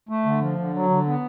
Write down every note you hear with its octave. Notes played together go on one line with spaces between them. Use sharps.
A3
D3
F3
D3
F#3
D3
B3